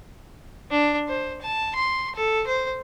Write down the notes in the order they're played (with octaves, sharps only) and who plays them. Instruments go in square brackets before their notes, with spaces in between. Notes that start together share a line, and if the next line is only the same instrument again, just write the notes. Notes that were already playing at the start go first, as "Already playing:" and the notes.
[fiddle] D4
C5
A5
C6
A4
C5